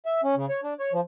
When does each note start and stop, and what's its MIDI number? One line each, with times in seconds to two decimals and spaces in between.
0.06 0.21 76
0.24 0.35 61
0.36 0.46 49
0.49 0.61 73
0.63 0.74 62
0.80 0.92 73
0.93 1.01 53